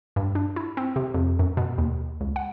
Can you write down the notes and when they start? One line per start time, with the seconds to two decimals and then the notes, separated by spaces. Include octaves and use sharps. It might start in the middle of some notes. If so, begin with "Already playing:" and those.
0.16 G2
0.35 D4
0.56 E4
0.77 C4
0.96 C3
1.14 F2
1.39 F#2
1.57 B2
1.78 D#2
2.21 C#2
2.36 F#5